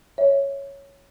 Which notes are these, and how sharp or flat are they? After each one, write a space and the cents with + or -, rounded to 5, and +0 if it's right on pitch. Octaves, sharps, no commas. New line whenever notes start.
C#5 +0 E5 +0